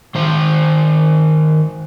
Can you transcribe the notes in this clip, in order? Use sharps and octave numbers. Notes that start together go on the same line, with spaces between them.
D#3 C5